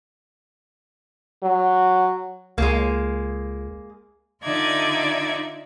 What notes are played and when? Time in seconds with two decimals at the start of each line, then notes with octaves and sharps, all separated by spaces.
1.43 F#3
2.58 C#2 G#3 A#3
4.43 D3 D#4 F4 D5 E5 G#6